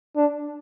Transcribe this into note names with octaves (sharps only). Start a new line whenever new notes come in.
D4